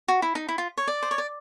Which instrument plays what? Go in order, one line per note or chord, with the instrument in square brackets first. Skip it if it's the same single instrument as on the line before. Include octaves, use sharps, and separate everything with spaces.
[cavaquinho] F#4
E4
D#4
E4
F4
C#5
D5
C5
C#5
D5